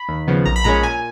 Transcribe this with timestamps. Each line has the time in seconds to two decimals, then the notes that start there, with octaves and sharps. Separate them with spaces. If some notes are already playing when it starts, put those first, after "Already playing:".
Already playing: B5
0.09 D#2
0.28 C#3 F3 B3
0.45 A#1 A#5
0.56 B5
0.64 A#2 G#3 C#4 A#5
0.83 A#2 G#5